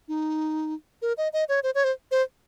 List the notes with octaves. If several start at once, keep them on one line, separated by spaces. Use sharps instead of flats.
D#4
A#4
D#5
D#5
C#5
C5
C#5
C5
C5